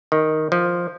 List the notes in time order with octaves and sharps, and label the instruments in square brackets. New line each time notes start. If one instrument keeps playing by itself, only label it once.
[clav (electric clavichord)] D#3
F3